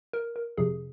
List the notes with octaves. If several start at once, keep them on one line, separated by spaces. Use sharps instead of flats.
A#4
A#4
F2 C3 F3 G#4